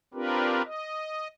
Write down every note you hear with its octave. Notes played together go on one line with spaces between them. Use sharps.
C4 D4 F4 G4 A#4 B4
D#5